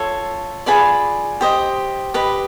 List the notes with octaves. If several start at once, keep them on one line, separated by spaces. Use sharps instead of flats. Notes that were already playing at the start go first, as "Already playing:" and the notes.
Already playing: F4 A4 C#5
F4 G#4 B4 D5 B5
G4 C5 D#5
G4 B4 D#5